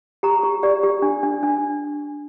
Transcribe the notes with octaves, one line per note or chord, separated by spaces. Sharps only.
G4 A#5
G4
G4 D5
G4
D4
D4
D4